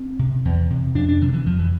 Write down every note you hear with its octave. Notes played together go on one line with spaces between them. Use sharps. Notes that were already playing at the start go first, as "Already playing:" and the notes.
Already playing: C4
C3
E2
C3
F2 D4
D4
C3 E3
D3
E3
F2 F3
E3